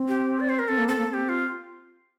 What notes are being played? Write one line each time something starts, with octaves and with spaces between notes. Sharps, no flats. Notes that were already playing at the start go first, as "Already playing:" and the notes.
Already playing: C4
G4
D5
C5
A#4
C4 A4
A#3
C4 A4
A#3
C4 G4 A4
F4